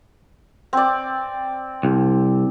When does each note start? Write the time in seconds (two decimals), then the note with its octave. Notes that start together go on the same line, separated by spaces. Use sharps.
0.73 C4 D5
1.83 C2